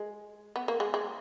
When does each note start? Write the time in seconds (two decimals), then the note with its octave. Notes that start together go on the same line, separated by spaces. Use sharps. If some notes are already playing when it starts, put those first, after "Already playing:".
Already playing: G#3
0.56 B3
0.68 A#3
0.80 G#3
0.94 G#3